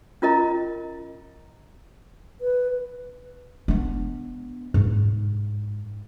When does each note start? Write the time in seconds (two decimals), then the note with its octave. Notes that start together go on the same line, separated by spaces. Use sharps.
0.22 C#4 F4 A#4 D#5 A#5
2.41 B4
3.68 B3 D4
4.74 G#2